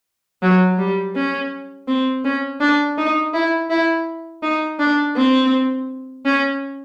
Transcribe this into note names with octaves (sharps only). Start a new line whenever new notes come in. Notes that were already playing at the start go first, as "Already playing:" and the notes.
F#3
G3
C#4
C4
C#4
D4
D#4
E4
E4
D#4
D4
C4
C#4